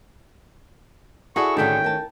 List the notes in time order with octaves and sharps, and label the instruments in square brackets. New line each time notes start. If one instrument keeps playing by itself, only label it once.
[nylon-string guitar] E4 D5 F#5 [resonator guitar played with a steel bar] F#4 G#4 A4 [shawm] C#6
[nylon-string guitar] A2 D3 [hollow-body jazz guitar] D#3 A3 C#4 [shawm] G5
[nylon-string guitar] A#4 A5